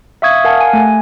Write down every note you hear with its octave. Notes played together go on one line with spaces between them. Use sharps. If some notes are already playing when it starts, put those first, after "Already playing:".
E5 F5 C#6 D#6 G#6
A#4 F5 F#5 G#5 A5
G#5
A3 G#5